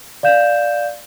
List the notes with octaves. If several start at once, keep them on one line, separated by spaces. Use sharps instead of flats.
D5 F5 G6 E7